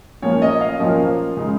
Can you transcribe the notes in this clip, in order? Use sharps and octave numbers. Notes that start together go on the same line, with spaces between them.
A#2 F3 A#3 C#4 C#5
D#5
F5
A#2 F3 A#3 C#4
C#3 G#3 D#4